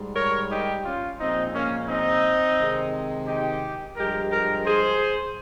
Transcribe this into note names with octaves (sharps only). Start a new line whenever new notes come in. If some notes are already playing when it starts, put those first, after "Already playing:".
Already playing: G#2 G3
A#4 C#5
D#4 G4
C#4 F4
A#2 F3 G#3 C4 D#4
A#3 C#4
C4 D#4
C3 D#3 G#3
D#4 G4
G2 F3 G#3 G4 A#4
G4 A#4
G#4 C5